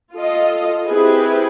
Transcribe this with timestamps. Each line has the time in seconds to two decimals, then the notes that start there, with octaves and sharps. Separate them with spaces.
0.14 F4 A4 D#5
0.86 C4 E4 G4 G#4 B4